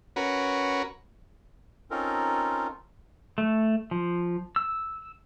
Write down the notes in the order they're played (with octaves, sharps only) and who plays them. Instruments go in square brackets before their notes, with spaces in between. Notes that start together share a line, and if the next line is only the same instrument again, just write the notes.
[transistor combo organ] C#4 F#4 A#4 B4
[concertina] C4 C#4 D#4 F4 A4 A#4
[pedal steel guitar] A3
F3
E6